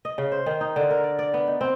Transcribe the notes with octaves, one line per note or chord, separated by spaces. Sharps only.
D#5
C#3
C5
D#3
D#4
D3
A#4
D5
D5
B3
D#4
C4